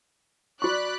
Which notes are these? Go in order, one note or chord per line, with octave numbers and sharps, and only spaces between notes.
F#4 D5 B5 C#6 F#6